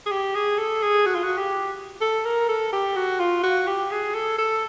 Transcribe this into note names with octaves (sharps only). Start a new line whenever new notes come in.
G#4
G4
G#4
A4
G#4
F#4
F4
F#4
G4
A4
A#4
A4
G4
F#4
F4
F#4
G4
G#4
A4
A4